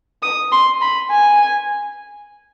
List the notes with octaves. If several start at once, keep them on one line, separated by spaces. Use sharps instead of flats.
D#6
C6
B5
G#5